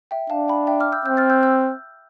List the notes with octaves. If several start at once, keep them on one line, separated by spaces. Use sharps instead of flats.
E5 G5
D4 F5 A5
G5 B5
E5 G5
D6 F6
E6 G6
C4 E6 G6
F6 A6
E6 G6
E6 G6